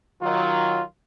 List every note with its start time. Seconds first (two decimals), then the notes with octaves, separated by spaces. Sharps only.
0.22 D#3 F#3 F4